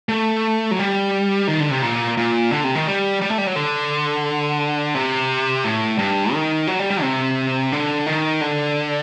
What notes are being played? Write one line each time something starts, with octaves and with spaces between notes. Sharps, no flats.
A3
F#3
G3
D#3
D3
C3
A#2
A#2
D3
C3
D#3
G3
G3
A3
G3
F#3
D3
C3
A2
G2
D#3
F#3
G3
G3
C3
D3
D#3
D3